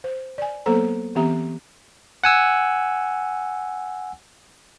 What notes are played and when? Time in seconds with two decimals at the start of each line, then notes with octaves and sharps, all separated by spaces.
0.04 C5
0.38 D5 G#5
0.66 F#3 A#3 B3 A4 C5 A#5
1.15 E3 B3 C4 G4 E5 A#5
2.24 F#5 G#5 E6